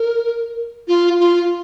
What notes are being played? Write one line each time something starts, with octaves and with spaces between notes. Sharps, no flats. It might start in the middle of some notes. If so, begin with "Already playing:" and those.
Already playing: A#4
F4
F4